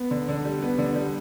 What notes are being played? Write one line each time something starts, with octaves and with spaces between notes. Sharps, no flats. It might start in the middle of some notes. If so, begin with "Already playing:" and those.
Already playing: B3
D3
D3
G3
B3
D3
G3